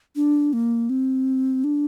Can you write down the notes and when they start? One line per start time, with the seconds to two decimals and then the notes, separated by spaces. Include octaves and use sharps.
0.16 D4
0.53 A#3
0.90 C4
1.64 D4